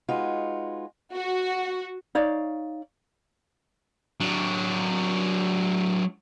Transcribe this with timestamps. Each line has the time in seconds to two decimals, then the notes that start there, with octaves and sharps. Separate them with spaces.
0.08 G#3 D#4 F4 F#4 B4
1.11 F#4
2.15 D#4 C#5 D5 F5
4.20 F#3 D4